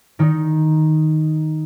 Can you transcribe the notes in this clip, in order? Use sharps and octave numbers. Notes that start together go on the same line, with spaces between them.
D#3 D#4